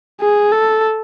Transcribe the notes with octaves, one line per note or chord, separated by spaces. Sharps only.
G#4
A4